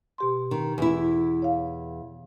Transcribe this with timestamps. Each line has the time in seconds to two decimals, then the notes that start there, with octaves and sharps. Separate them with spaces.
0.18 B2 G4 C6
0.51 D#3
0.78 E2 E3 E4
1.42 C#5 F5